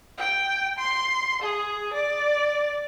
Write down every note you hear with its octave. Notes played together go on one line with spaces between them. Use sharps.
G5
C6
G#4
D5